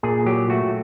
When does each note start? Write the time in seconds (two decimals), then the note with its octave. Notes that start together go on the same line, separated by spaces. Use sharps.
0.03 A#2 G#4
0.26 F#3 G4
0.50 A3 F#4